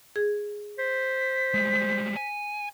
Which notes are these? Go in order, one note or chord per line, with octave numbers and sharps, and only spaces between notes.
G#4
C5 B6
G3 G#3
G#5